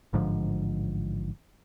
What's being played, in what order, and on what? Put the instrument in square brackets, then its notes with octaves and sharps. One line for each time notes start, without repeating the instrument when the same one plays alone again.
[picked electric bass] A1 G#2 D3 F3